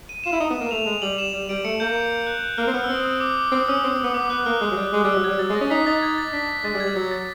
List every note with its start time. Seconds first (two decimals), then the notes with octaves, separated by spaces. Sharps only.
0.09 D#7
0.24 F4 E7
0.33 E4
0.40 D#4
0.50 B3
0.61 A#3
0.71 A3 F7
0.86 G#3
1.02 G3 F#7
1.18 E7
1.33 G3 E7
1.49 G3 D7
1.64 A3 C#7
1.80 A#3 G6
2.27 F#6
2.58 A#3 F6
2.67 C4
2.74 B3 F6
2.84 E6
2.90 C4 D#6
3.05 E6
3.20 D6
3.37 D6
3.52 C4 D#6
3.63 D#6
3.68 C#4 E6
3.84 C4
3.94 C4
4.04 B3
4.14 B3 D6
4.30 B3 F#6
4.46 A#3 F6
4.61 G#3
4.72 F#3
4.77 G3
4.93 G#3
5.04 G3 E6
5.16 F#3
5.24 G3 G#6
5.39 F#3 A6
5.50 G#3
5.55 A#6
5.61 C#4
5.70 D#4 B6
5.87 D#4 A6
6.02 G#6
6.18 A6
6.33 D4 B6
6.49 B6
6.64 G#3 A6
6.74 G3
6.80 G#6
6.86 G3
6.96 F#3 G#6
7.11 A6